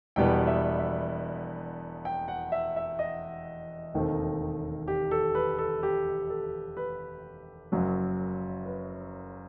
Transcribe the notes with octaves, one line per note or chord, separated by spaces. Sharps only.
E1 E2 B2 G3 B3 G5
E5
E5
G5
F#5
E5
E5
D#5
E1 D#2 D#3 A3 C4
G4
A4
B4
A4
G4
A4
B4
F#1 F#2 F#3
B4